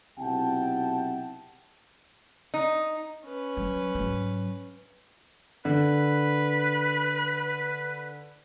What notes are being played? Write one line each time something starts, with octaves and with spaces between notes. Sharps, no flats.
B1 C3 E4 F#5 G5 A5
D#4
C#4 B4
F#3
G#2 F#3
D3 B4